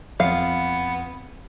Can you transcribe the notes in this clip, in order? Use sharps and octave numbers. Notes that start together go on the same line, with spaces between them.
F2 B3 F5